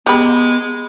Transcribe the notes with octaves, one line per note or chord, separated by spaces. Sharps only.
G#3 B3 G4 B5